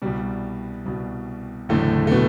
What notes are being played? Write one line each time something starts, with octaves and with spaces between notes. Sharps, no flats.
C2 B2 G3
C2 B2
F#1 E2 A2 D3 A3
A3
B2 B3